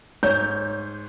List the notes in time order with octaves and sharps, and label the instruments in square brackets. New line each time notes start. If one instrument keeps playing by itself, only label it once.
[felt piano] G#2 [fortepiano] C#5 [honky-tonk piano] G6